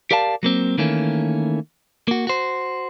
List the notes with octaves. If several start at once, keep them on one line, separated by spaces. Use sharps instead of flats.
G4 A#4 D5 F5 A5
F#3 A#3 C4
D#3 E3 A3 A#3 C#4
A#3 F#4
F#4 C5